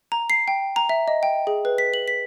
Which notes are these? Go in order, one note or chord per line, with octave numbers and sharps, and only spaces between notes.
A#5
C7
G5
A#5
E5
D#5
G5
G#4
B4
B6
F#7
B6